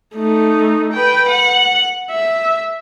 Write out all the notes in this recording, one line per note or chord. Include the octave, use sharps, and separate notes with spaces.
A3 D#4
B4 G5
F#5
E5